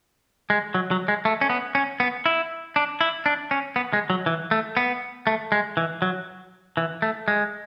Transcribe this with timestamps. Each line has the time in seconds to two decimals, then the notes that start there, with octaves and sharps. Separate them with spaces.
0.50 G#3
0.75 F#3
0.91 F#3
1.08 G#3
1.25 A3
1.41 C#4
1.50 B3
1.75 C#4
2.00 B3
2.26 E4
2.76 D4
3.01 E4
3.26 D4
3.51 C#4
3.76 B3
3.93 G#3
4.10 F#3
4.26 E3
4.51 A3
4.77 B3
5.27 A3
5.52 G#3
5.77 E3
6.02 F#3
6.77 E3
7.02 A3
7.28 G#3